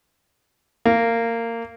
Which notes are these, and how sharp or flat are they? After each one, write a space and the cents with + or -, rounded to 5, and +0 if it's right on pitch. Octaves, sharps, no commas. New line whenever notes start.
A#3 -20